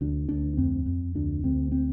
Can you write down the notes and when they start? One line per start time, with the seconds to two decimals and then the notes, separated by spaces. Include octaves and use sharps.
0.01 D2 D4
0.29 D2 D4
0.57 F2 C4
0.86 F2
1.15 D2 D4
1.44 D2 C4
1.72 C4